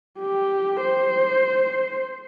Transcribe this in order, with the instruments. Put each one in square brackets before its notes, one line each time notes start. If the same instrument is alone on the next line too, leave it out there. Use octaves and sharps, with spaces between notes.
[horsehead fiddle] G4
C5